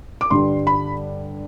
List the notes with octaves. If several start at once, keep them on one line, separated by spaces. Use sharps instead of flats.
D6
G2 D3 G3 C6
B5